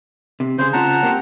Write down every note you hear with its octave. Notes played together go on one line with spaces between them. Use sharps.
C3
C#3 C#4 G#4 C5
C#3 C#4 F4 F#5 A5 A#5
A#3 C4 G4